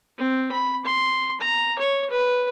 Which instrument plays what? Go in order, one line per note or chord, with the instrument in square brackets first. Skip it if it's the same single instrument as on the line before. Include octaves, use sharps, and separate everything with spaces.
[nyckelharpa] C4
B5
C6
A#5
C#5
B4